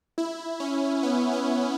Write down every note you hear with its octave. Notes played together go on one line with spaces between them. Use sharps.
E4
C#4
B3
C#4